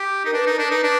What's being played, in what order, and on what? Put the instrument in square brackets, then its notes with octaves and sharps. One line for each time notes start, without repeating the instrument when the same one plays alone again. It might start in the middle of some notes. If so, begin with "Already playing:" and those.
Already playing: [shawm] G4
[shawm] D#4 [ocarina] A#4
[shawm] D4 [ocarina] B4
[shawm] D#4 [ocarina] A#4
[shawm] D4 [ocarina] A#4
[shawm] D#4 [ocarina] B4
[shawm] D4 [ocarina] B4